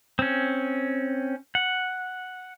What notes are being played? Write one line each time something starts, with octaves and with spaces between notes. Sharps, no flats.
C4 C#4
F#5